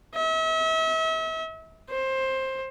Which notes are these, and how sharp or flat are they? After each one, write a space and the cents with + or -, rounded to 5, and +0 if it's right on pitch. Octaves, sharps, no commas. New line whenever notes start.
E5 -40
C5 +15